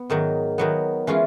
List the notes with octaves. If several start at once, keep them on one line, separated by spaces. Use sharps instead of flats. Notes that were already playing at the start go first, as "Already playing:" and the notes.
Already playing: B3
G#2 D#3 F#3
D#3 F#3 B3
E3 G#3 C#4 F4